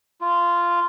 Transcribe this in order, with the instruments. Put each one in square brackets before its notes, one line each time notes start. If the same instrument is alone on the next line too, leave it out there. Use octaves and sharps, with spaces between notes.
[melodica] F4